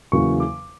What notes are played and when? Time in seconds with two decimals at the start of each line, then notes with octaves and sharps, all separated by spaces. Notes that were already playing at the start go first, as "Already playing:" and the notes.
0.12 E2 C#3 F#3 A#3 C#6
0.40 D6